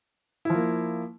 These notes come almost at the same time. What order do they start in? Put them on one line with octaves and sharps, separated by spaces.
E4 F3 A#3